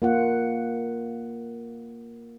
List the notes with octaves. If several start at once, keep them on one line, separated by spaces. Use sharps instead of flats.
A#3 F4 F#5